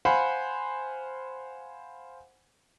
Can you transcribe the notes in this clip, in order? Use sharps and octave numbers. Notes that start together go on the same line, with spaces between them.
C5 F5 F#5 G#5 B5